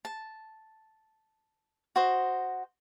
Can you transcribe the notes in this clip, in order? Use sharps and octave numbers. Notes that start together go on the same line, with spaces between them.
A5
F#4 C5 D#5